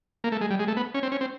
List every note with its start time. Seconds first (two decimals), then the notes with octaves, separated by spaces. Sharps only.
0.24 A#3
0.32 A3
0.41 G#3
0.50 G3
0.59 G#3
0.68 A3
0.77 B3
0.94 C#4
1.03 C4
1.12 C#4
1.21 C4